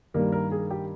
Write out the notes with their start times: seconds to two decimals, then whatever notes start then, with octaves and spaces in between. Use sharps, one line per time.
0.14 G2 D#3 G3 A#3 A#4
0.32 A#4
0.51 G#4
0.71 G4